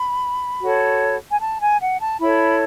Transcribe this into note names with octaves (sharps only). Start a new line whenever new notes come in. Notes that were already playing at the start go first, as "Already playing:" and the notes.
Already playing: B5
F#4 A4 C#5
G#5
A5
G#5
F#5
A5
E4 A4 C#5 B5